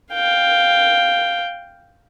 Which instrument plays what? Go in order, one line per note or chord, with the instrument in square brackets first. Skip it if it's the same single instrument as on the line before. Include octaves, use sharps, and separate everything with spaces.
[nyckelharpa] F5 G5